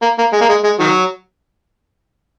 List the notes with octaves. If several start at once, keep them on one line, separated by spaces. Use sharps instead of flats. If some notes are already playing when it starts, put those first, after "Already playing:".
A#3
A#3
G#3
A#3
G#3
G#3
D#3 F#3